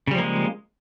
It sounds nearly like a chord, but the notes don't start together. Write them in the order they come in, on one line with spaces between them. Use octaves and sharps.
C#3 G3 F3 A#3 G#3